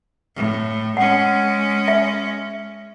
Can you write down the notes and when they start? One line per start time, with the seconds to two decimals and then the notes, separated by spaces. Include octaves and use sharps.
0.36 A2
0.97 G#3 C#4 F#5
1.88 E5